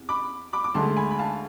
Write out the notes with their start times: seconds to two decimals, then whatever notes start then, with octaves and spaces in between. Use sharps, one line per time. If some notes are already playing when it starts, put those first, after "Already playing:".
Already playing: E2 C3
0.09 B5 D6
0.53 B5 D6
0.64 D6
0.75 D2 D3 G#3 A5 C6
0.96 G#5 B5
1.11 B5
1.19 F5 A5